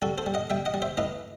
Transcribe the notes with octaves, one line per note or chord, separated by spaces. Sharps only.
G3 F#4 A4
A4 C5
G3
D#5 F#5
G3 E5 G5
D#5 F#5
G3
C5 E5
A2 B4 D#5